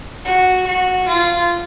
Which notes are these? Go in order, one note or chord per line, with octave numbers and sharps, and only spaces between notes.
F#4
F#4
F4